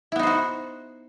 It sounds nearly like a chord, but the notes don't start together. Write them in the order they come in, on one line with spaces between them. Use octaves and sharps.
E4 B3 D#4 C5 F#4